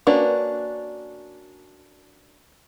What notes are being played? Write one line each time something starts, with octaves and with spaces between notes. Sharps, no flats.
A#3 C#4 D4 F#4 B4